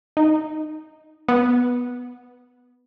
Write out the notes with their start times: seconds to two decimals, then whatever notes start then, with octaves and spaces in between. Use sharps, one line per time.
0.17 D#4
1.28 B3